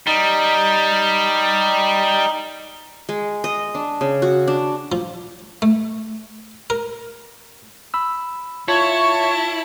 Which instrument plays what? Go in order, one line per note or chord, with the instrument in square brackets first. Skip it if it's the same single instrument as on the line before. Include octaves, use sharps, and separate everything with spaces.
[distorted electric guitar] G3 [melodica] D#4
[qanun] G#3
D#5
D4
C#3
F#4
D4
[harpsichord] F3
A3
A#4
[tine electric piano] B5 E6
[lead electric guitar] E4 [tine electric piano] F4 [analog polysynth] C#5 [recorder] A5